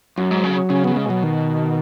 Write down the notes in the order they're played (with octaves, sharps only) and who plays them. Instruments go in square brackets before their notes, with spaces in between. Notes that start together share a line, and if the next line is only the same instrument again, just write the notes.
[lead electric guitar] F#2 [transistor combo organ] F#3
[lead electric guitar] G#2
C#3
[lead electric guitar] C#3 [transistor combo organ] C#4
[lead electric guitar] C#3 [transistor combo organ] B3
[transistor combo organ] G#3
[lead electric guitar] B2 [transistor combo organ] F#3
[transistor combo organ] D#3